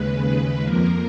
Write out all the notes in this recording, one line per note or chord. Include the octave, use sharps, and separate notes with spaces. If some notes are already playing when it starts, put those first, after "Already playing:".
Already playing: D#2 C#3 G#3 B4
F2 F3 A#3 A#4